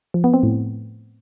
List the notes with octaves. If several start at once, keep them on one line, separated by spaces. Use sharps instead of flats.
F3
B3
C4
A2